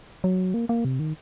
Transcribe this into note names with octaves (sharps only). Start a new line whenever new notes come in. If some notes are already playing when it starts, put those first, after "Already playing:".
F#3
A#3
A#3
C3
D#3